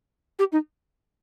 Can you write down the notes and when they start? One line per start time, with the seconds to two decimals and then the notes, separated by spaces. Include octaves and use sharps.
0.39 G4
0.52 D#4